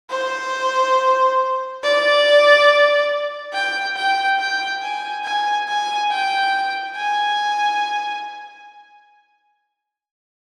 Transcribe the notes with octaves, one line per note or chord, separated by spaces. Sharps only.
C5
D5
G5
G5
G5
G#5
G#5
G#5
G5
G#5